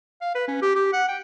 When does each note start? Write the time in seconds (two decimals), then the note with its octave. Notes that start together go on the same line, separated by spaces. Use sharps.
0.22 F5
0.35 B4
0.48 C#4
0.62 G4
0.76 G4
0.93 F#5
1.09 G5